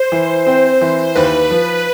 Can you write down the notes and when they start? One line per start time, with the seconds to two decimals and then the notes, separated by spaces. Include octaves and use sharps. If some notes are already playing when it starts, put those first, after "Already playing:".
Already playing: C5
0.12 E3
0.47 C4
0.81 E3
1.15 D#2 B4
1.51 F3